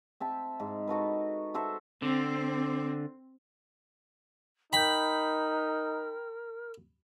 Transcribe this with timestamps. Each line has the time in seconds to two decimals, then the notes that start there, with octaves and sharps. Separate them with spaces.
0.20 C4 E5 A5
0.60 G#2
0.87 D#4 F#4 A4 B4
1.54 F#4 A4 C5 E5
2.02 D3 C4
4.73 D#4 A#4 G5 B5 G6